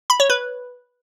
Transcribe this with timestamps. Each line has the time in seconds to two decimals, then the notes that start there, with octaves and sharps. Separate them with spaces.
0.10 B5
0.20 C#5
0.30 B4